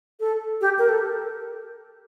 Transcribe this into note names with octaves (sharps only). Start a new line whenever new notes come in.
A4
G4
A#4
A4